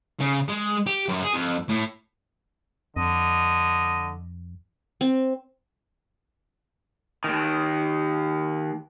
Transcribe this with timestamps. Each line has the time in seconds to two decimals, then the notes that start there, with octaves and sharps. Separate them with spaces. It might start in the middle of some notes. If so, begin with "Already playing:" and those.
0.20 C#3
0.49 G#3
0.86 G4
1.08 F#2
1.23 G#4
1.34 F2
1.69 A2
2.97 F2 D3 D#5
5.01 C4
7.24 D#2 D#3